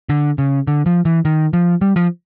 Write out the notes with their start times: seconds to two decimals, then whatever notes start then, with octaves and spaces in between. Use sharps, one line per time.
0.09 D3
0.38 C#3
0.67 D3
0.86 F3
1.05 E3
1.25 D#3
1.53 F3
1.81 G3
1.96 F3